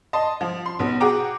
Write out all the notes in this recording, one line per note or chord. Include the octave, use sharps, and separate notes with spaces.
D#5 A5 C6
F3
C6
B1 B3
F#4 G#4 F#5 G5 A#5 D6